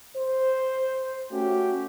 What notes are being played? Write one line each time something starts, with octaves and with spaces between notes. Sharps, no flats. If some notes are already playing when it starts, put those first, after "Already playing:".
C5
A3 C#4 F#4 G4